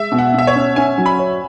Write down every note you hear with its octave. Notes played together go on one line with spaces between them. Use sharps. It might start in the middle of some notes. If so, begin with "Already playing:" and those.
Already playing: G#3 E5
B2
F#5
B2 E5
C#5
C#4
C#4 G#5
F#3
B5
C#5